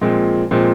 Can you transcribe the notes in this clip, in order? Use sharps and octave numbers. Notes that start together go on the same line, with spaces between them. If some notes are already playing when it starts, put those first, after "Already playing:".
A#2 F3 G#3 C4
A#2 F3 G#3 C4